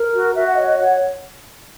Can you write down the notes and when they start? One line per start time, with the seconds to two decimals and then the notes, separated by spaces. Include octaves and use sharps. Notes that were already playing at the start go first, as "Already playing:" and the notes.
Already playing: A#4
0.14 F#4
0.34 F#4 E5
0.46 F#5
0.56 C#5 D#5
0.67 D#5
0.79 C#5 F#5